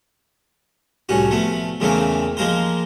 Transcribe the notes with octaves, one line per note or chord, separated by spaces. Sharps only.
C2 A2 C#4 F#4
F3 A3 B3
E2 A#2 C#3 A3 A#3 C4
F3 G#3 A#3 A#4 C5